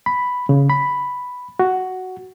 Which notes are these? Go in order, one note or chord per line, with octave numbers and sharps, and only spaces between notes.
B5
C#3
B5
F#4